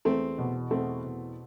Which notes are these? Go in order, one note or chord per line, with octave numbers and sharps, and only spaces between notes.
E2 A3 C4
B2
E2 A3 C4
B2